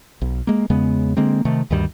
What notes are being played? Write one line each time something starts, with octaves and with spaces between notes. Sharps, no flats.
B1
G#3 A#3
E2 C#3 G#3 B3
D3 G#3 A#3 C4
C3 D#3 A3
D2 G2 D#3 G3